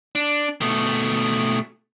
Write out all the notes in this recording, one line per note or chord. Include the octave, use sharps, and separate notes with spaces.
D4
B2 A3